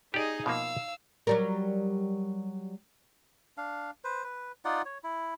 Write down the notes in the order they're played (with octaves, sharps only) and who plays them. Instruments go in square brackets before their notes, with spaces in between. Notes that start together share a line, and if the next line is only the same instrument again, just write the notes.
[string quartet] D#4 G#4 D#5 [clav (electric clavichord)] G4 D5
[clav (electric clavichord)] B2 F3 A#3 [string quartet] F5 E6
[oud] F#3 G3 A#4
[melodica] D4 F5
B4 C5
B4
D#4 F4 D5 F#5
C#5
E4